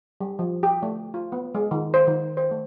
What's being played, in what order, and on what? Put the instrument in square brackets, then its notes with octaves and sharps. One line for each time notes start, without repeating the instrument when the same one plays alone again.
[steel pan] G3
F3
G4
A3
F4
B3
G#3
D#3
C5
D#3
C5
A3